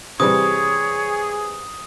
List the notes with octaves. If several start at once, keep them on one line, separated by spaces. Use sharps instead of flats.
C3 E3 G3 G#4 C#5 D#6